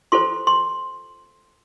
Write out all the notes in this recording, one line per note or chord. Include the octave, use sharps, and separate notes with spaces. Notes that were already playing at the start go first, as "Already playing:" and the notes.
F4 A4 C5 C6
C6